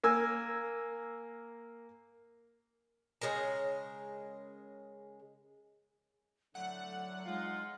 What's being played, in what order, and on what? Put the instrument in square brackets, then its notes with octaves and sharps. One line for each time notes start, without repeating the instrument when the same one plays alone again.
[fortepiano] A#3 G#5 E6
[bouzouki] C#3 G#3 A#4 A#5
[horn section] A2 D3 A3 [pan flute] F#3 [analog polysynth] F#5
[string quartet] G#3 [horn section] D#4 F4